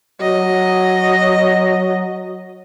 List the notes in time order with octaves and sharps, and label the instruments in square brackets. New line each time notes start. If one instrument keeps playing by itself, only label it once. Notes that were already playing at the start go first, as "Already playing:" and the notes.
[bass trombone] F#3 [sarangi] D#5